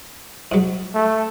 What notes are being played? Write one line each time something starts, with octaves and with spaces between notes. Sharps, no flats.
G#2 F#3
A3